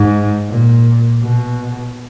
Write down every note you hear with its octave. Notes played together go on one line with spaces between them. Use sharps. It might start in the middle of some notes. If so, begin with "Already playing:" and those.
Already playing: G#2
A#2
B2